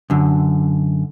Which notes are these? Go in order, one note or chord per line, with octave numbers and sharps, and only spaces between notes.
F#2 D3